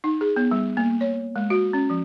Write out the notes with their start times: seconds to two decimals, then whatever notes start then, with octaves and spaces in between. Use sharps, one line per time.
0.04 D#4
0.21 G#4
0.36 B3
0.51 G3
0.77 A#3
1.01 C#5
1.36 G#3
1.50 F#4
1.73 C#4
1.90 F3